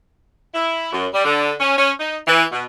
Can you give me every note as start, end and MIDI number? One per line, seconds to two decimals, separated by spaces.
0.54 0.92 64
0.93 1.06 42
1.13 1.24 55
1.25 1.53 50
1.60 1.76 61
1.77 1.92 61
2.00 2.17 63
2.27 2.43 52
2.52 2.64 47